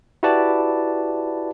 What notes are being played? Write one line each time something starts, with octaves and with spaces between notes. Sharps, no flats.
E4 F#4 G4 B4 D5 A5